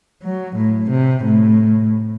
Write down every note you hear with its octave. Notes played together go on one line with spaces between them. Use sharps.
F#3
A2
C3
A2